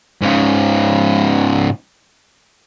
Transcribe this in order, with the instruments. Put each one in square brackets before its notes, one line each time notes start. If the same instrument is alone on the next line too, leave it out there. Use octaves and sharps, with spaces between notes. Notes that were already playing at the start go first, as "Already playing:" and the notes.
[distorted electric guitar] G#2 C#3